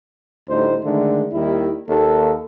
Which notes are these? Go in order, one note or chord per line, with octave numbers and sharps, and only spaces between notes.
D2 A2 G3 D#4 C5
D3 D#3 G#3 A3
D#2 D#3 G3 E4
D#2 A4